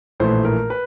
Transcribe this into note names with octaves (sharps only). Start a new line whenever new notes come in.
A#1 A2 E3 A3 C5
A#4
B4